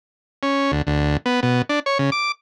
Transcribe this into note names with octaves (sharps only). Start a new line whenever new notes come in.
C#4
D2
D2
B3
B2
D4
C#5
C#3
D6